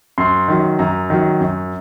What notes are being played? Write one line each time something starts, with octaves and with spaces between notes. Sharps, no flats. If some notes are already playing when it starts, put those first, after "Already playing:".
F#2 C6
D#3 F#3
F#2 A#5
D#3 F#3
F#2